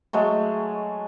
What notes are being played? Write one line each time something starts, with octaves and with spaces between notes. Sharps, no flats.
F#3 G#3 A3